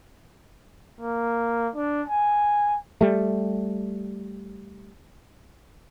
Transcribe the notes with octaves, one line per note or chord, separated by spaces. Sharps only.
A#3
D4
G#5
G3 A3